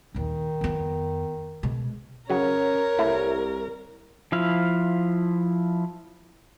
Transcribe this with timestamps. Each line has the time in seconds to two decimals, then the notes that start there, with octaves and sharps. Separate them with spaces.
0.14 A#1 D#2 D#3
0.61 F2 B3
1.63 B2 G#3
2.30 C#3 F#3 C#4 A#4 C#5
2.99 C2 A3 E4
4.32 F3 E4 F5